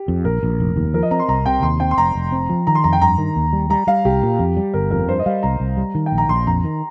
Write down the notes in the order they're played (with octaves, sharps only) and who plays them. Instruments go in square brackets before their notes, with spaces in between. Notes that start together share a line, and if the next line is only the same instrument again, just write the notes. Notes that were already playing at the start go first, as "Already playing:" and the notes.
Already playing: [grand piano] G4
[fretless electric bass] F2
[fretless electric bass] A#1 [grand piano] A#4
[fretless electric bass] A#1
F1
D#2
[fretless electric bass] F3 [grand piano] A#4
[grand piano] D#5
[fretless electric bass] C4 [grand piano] A#5
[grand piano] C6
[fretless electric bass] C2 [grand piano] A#5
[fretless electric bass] C3 [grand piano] G5
[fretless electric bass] D#2 [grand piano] C6
[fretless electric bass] C4 [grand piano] G5
[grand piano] C6
[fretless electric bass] F1 [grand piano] A#5
[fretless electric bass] F1
C4
F3
[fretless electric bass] D#3 [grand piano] A#5
[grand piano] C6
[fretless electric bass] F2 [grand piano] A#5
[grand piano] G5
[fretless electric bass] G2 [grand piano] A#5
[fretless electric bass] D#3
D#2
G3
[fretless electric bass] G3 [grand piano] A#5
[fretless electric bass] G3 [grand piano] F5
[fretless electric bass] C2 [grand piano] G4
[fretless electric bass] A#2
F2
G3
[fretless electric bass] G1 [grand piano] A#4
[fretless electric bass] F2 [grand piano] A#4
[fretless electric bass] G2 [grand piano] C5
[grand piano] D#5
[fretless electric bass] G3 [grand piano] F5
[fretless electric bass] C2 [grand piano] A#5
[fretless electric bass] C2
G3
D#3
[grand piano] G5
[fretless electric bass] A#1
[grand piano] A#5
[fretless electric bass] A#1 [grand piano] C6
[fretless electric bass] F2 [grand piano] A#5
[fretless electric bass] D#3